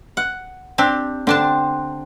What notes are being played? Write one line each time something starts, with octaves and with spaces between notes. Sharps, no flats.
F#5
C4 D4 G4
D3 C4 D4 A5